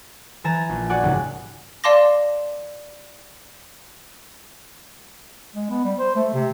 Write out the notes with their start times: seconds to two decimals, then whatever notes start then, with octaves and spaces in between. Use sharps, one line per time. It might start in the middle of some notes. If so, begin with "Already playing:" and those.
0.44 E3 G#5 A#5 A6 E7
0.69 A#1
0.89 F#4 D5 F#5 G#5 D6
1.03 C#2 G#2 C3
1.84 D5 F5 A5 C6 D6 A#6
5.55 G#3
5.70 B3
5.84 G3
5.98 C5
6.16 A3
6.34 C3